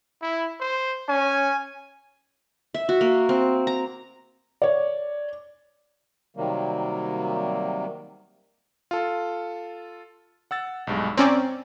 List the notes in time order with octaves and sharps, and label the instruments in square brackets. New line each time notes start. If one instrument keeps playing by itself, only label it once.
[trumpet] E4
C5
[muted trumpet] C#4 [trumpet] G#5
[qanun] E5
F#4
A#3
C4
A#5
[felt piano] C#5 D5
[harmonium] C3 D#3 F#3 G3 A#3
[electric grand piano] F4 A4
F#5 E6 A6
B1 G2 G#3
[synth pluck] C4 C#4 D5 [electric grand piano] A#5